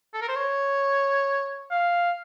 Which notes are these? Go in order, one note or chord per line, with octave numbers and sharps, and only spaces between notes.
A4
A#4
C5
C#5
F5